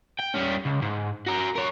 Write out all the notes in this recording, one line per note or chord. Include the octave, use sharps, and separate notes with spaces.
G5
G3 C#4
C#2
G#2
F#4 A#4
A#4 C#5